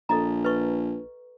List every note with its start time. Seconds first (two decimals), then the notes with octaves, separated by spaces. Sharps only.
0.09 A#1 A4 D#5 A#5
0.45 B4 D#5 C#6